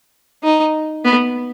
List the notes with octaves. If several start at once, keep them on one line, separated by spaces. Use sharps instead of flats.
D#4
B3